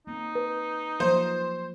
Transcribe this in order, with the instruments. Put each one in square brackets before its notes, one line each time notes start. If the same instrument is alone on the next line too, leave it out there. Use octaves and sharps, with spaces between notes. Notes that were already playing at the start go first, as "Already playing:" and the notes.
[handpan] A#3 C4 [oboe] D#4
[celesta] B4
[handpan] F3 F#3 A#3 [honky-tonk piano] C5